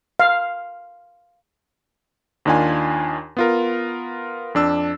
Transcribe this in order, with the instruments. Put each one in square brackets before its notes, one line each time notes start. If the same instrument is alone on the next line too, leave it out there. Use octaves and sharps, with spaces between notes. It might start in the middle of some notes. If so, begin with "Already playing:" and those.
[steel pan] F5
[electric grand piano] D#2 D#3 D4 F4 G#5
B3 F4 A#4
F2 D4 E6